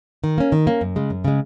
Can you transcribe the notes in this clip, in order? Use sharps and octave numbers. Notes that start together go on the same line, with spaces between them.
D#3
A#3 C#4
D#3
A#3 C#4
F#2
C#3 G#3
F#2
C#3 G#3